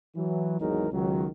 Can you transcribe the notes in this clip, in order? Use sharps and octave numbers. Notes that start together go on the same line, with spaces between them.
E3 F#3
G#1 E2 F#3 G#3 D#4 A#4
C#2 D#3 F#3